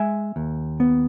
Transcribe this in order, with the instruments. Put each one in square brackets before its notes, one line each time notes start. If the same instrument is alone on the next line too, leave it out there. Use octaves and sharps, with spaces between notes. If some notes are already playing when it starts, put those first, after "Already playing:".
Already playing: [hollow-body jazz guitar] G#3 E5 G#5
D#2
B3